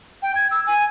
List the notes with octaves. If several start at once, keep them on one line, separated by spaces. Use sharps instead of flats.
G5
G#6
E6
G#5